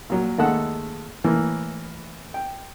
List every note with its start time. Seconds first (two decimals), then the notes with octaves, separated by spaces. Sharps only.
0.10 A#2 F#3
0.38 D#2 G#3 A3 A4 F#5 E6
1.24 A2 E3 A#3
2.34 G5